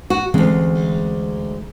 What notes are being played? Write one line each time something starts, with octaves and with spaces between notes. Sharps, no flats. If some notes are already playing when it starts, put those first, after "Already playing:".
F#4
D2 E3 G#3 C4 C#4